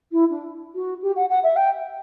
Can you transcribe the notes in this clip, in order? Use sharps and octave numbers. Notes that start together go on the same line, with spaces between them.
E4
D4
F#4
G4
F#5
F#5
E5
G5